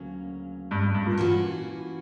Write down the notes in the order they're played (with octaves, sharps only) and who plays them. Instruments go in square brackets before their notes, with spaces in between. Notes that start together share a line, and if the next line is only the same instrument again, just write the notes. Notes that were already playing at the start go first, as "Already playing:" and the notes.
Already playing: [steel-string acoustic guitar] D2 C#3 F#3 A#3 C#4
[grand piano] G2
G2
G2
A#2
[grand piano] A#2 [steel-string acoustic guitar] E3 A#3 C#4 F#4